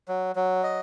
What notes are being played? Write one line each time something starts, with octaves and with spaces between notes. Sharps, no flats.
F#3
F#3
D#5